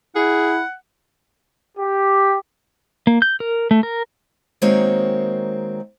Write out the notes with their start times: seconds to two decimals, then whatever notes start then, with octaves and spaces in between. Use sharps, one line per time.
0.15 E4 G#4 F#5
1.78 G4
3.07 A#3
3.22 G6
3.40 A#4
3.71 A3
3.83 A#4
4.62 D#3 G#3 A#3 C4 F#4 C#5